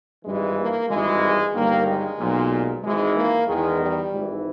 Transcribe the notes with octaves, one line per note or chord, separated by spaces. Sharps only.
G#1 G2 E3 G#3
A#3
G#1 G2 E3 G#3
G1 G2 D#3 A#3
G#3
B1 A#2
G#1 G#2 E3 G#3
A#3
E2 D#3 G#3
G3
G#1 G#2 E3